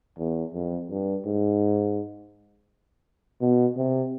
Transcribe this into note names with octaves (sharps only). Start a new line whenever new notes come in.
E2
F2
G2
G#2
B2
C3